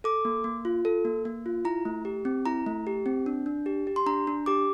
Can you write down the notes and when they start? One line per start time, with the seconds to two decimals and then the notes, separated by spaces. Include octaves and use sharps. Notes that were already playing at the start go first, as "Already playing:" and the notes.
0.04 A4 D6
0.25 A#3
0.44 A#3
0.65 F4
0.85 A4
1.05 A#3
1.25 A#3
1.46 F4
1.65 E4 A#5
1.85 A3
2.05 G4
2.25 C4
2.46 E4 A#5
2.66 A3
2.87 G4
3.06 C4
3.26 D4
3.46 D4
3.66 G4
3.87 G4
3.96 C6
4.06 D4 A#5
4.27 D4
4.46 G4 D6